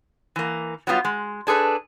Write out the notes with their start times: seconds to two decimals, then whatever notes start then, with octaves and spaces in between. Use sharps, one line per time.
0.36 E3 A#3
0.87 F#3 G3 B3 F4
1.05 G#3
1.47 D4 G#4 A4 B4